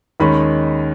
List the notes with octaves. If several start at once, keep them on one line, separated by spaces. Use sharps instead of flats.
D#2 D#3 G#3 C#4 B5